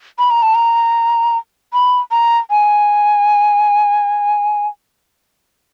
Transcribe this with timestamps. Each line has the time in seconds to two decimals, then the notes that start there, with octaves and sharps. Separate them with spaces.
0.19 B5
0.31 A#5
0.42 A5
0.55 A#5
1.73 B5
2.11 A#5
2.50 G#5